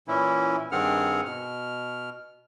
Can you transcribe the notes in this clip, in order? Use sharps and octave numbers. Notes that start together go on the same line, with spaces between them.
A#2 E3 C#4 E4
G2 D#3 C4 G#4 F#5 F6
B2 F6